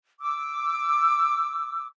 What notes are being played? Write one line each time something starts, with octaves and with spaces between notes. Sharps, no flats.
D6 E6